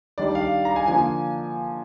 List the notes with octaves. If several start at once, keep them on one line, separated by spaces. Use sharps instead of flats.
D#3 G3 D4 D5
F5
A#5
G#5
D3 F3 A#3 G#5